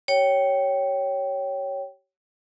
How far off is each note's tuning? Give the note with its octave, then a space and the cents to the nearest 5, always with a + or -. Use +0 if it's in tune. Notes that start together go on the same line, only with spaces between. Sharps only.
G4 -35 C#5 +0 G5 -10